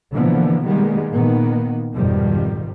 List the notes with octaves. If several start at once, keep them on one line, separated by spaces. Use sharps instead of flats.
B2 D3 E3 F3 A#3 B3
D#3 G3 G#3 A#3 B3
A#2 D#3 A#3 B3
G#1 F2 B2 D#3 F3 G3